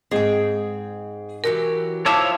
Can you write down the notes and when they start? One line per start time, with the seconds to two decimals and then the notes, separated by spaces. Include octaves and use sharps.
0.11 G#2 C4 G#4 G5
1.44 E3 F#3 G4 A#4
2.06 F3 E4 F4 C#5 E5 A5 D6 E6